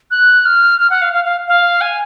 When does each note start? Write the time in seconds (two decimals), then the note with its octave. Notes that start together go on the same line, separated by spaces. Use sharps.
0.11 F#6
0.45 F6
0.79 F6
0.90 F#5
1.02 F5
1.13 F5
1.25 F5
1.48 F5
1.81 G#5